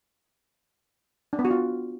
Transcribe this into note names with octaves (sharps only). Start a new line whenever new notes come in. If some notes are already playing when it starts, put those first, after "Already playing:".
D4
B3
F#4
F4